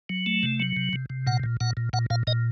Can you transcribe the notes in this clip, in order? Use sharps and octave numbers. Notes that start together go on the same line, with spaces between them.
F#3
A3
C3
F#3
C3
C3
C3
A#2 F#5
A#2
A#2 F#5
A#2
A#2 F#5
A#2 F5
A#2 D#5